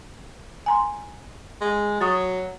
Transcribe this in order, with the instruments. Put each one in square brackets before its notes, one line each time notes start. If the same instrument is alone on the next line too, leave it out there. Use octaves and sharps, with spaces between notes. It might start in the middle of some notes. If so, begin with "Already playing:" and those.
[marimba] G#5 A#5 C6
[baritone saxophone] G#3
[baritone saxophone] F#3 [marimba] C#6 D#6 A6